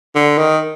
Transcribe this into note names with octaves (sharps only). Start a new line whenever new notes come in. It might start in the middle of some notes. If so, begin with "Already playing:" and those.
D3
D#3